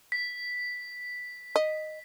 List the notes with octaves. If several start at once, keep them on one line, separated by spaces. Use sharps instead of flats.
B6
D#5